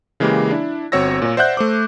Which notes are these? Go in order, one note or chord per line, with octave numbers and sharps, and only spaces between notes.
C#3 E3 G#3 A#3 G4
D4 E4
G1 C4 F#4 C#5 E6 A#6
A#2 C#5
C5 D5 E5 F#5 F#6 G6
A3 C5 D6